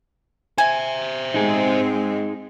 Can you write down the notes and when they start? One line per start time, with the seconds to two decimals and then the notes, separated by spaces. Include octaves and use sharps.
0.58 C5 E5 G#5
1.34 G#3 C4 D#4 G#4